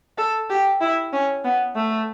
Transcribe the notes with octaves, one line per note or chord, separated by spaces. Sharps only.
A4
G4
E4
C#4
B3
A3